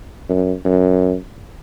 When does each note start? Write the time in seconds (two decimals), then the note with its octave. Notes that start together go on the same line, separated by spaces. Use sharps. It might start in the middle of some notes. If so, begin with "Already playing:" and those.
0.29 F#2
0.65 F#2